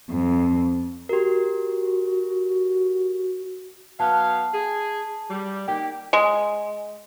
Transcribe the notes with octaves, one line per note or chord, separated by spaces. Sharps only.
F2
F#4 G4 A#4
F#3 B3 F5 A5
G#4
G3
A#3 D#4 G4 G5
G#3